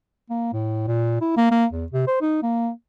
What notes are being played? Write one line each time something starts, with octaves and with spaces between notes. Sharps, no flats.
A#3
A2
A#2
E4
A#3
A#3
E2
C3
C5
D#4
A#3